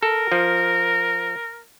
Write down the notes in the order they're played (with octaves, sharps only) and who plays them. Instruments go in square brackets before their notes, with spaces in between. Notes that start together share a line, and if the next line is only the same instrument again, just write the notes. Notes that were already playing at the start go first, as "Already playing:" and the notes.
[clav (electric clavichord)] A4 [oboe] A#4
[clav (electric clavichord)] F3